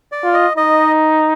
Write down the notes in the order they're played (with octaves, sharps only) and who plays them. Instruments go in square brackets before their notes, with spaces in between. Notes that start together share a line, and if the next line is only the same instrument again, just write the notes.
[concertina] D5
[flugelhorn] F4
[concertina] D#5
[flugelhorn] D#4 [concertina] D#5